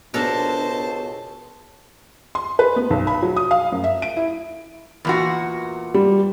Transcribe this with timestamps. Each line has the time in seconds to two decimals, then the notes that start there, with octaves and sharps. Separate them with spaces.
0.14 C#2 B2 D4 A4 A#4 C5 A5
2.35 C6
2.59 B4
2.76 B3
2.90 B1
3.07 B5
3.22 F#3
3.37 D#6
3.51 F5
3.72 F#2
3.84 E5
4.02 D7
4.17 E4
5.05 E2 A#2 F#4
5.94 G3